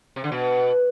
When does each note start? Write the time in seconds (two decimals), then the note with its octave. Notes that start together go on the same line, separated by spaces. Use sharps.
0.16 C3
0.24 D3
0.32 B2